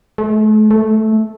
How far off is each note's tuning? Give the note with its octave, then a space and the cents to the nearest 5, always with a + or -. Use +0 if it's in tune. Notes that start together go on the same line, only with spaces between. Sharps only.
A3 -40
A3 -10